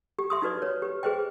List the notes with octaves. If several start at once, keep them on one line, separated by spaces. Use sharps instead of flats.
G4
E5 C6 D#6
D#4 F#4 B4 D5
B4 C#5
G4 B4
G#4 B4 C5 D#5 G5